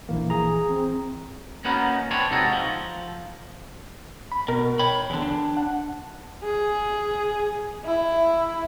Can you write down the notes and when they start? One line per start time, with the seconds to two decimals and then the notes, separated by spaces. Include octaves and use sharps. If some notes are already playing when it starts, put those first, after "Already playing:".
0.09 A#1 E3 A#3
0.30 G#4 A#5
0.69 C4
1.65 A#3 B3 C#4 D#4 F#4 B4
2.11 C4 D4 B4 C#5
2.30 G#2 C3 D#4 F#4 A4 D#5
2.52 F3
4.32 B5
4.48 B2 A#4
4.79 C#5 G5 B5
5.10 E2 D3
5.22 D4
5.57 F#5
6.44 G#4
7.85 E4